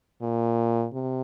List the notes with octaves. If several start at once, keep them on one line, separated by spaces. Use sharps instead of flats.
A#2
C3